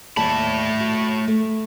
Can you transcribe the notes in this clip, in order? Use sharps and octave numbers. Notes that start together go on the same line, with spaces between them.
D#2 G3 A3 A5 B5
F#4
A3